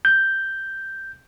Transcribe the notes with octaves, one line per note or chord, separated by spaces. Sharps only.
G6